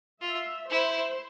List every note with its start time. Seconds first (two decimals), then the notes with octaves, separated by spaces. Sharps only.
0.22 F4 E5
0.70 E4 C5